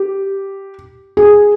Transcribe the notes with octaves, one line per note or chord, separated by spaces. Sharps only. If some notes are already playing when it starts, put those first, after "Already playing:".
Already playing: G4
G#4